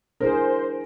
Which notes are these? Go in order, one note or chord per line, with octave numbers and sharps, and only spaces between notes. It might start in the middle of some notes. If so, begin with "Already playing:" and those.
D4 E4 G#4 A#4 C5